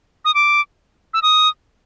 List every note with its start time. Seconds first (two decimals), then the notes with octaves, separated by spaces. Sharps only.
0.25 D#6
0.35 D6
1.14 E6
1.22 D#6